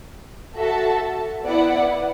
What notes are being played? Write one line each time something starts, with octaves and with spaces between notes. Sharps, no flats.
F#4 A4 E5 A5
B3 E4 D5 F#5